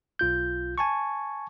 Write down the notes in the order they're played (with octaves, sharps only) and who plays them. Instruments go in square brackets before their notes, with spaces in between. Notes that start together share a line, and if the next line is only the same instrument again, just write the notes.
[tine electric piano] B1 F4 G6
G#5 A5 C#6